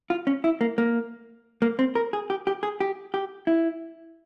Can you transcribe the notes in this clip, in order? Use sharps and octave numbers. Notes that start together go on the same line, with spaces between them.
F4
C#4
E4
A#3
A#3
A#3
C4
A#4
G#4
G4
G4
G#4
G4
G4
E4